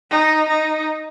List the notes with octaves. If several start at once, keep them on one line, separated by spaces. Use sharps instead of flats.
D#4
D#4